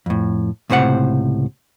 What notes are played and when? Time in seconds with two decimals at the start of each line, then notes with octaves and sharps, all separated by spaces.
0.06 F2 A2
0.70 C#2 A2 C3 C5 F#5